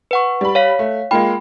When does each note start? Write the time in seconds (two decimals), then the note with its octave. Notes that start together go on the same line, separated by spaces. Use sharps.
0.11 B4 F#5 C#6
0.41 G3 B5
0.55 C#5 F5 B6
0.79 A3
1.11 G#3 A#3 F4 G5 B5